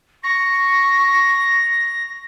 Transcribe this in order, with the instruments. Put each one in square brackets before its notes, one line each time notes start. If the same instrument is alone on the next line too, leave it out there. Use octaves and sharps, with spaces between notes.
[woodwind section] C#6 [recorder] A#6